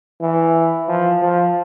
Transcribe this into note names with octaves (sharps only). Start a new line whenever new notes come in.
E3
F3
F3